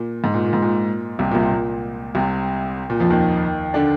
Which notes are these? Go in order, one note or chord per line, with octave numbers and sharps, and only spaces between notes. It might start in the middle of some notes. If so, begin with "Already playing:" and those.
Already playing: A#2
G#2
A#2
A#2
G#2
A#2
C2 C3
A#2
C2 C3
A#2
C2 C3
A#2
F2 F3
D#2 D#3
D3 D4